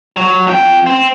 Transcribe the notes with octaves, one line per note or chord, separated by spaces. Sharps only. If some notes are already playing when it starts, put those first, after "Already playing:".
F#3
F2 G5
C4